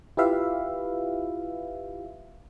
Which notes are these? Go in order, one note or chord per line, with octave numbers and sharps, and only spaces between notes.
E4 F4 G4 B4 E5 F5